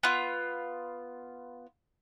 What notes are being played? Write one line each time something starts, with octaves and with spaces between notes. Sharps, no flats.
B3 F4